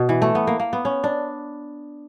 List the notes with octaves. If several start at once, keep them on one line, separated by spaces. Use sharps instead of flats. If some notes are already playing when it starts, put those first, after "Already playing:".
Already playing: B2
E3
A3
B3
A#3
A#3
B3
C#4
D4